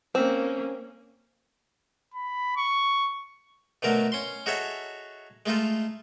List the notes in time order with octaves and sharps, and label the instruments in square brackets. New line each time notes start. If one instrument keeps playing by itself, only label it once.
[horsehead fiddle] A#3 C#4 [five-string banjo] C4
[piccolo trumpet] B5
C#6
[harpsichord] B2 D3 F#3 A3 A#4
C#4 C6
D#4 F#4 G#4 A4 C#5 E5
G#3 A3 D#4 F4 A4